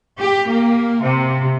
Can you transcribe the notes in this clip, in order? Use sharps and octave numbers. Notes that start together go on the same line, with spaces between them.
G4
A#3
C3